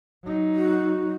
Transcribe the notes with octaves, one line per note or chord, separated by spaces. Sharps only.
F#3 D#4
F#4